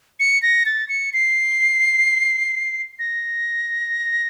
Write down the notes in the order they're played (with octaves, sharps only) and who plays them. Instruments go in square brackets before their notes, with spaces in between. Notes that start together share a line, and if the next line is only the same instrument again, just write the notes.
[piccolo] C#7
A#6
A6
C#7
C7
A#6